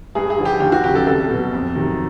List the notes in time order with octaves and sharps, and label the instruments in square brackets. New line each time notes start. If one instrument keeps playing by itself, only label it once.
[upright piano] G2 G#4
G#4
D3 F3
G4
D#2 G4
F#4
C#3 F#3 G4
A4
C2 A4
B2 F#3
F2
C3 D#3 F#3